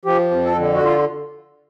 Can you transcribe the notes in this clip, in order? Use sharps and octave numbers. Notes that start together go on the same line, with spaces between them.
F3 G4
F2
A4
D3
F#4
F4